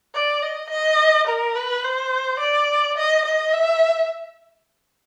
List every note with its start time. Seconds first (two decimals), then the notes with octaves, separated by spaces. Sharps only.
0.15 D5
0.42 D#5
0.70 D#5
1.28 A#4
1.55 B4
1.84 C5
2.40 D5
2.98 D#5
3.26 D#5
3.53 E5